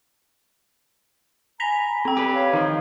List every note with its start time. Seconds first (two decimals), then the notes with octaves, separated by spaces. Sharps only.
1.60 G#5 A#5 B5 A#6 B6 F7
2.05 C4 G5
2.17 G4 B4
2.33 C#5 F5
2.53 D#3 F3